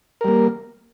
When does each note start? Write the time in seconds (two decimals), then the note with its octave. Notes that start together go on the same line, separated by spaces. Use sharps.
0.21 A#4
0.24 G3
0.28 A#3